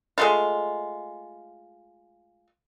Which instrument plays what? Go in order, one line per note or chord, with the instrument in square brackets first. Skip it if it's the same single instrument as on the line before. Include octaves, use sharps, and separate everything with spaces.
[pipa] G#3 A3 F4